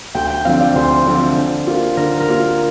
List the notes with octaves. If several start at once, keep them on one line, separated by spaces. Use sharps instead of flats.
D2 G5
G5
D3 F3 C4 F5
D5
D2 C5
D3 F3 C4
D3
A#3 F4
D3 A#4
A#4
A#3 F4